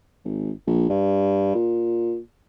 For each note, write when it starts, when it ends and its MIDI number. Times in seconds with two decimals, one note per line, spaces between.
0.24 0.51 32
0.67 0.86 34
0.89 1.54 43
1.55 2.18 46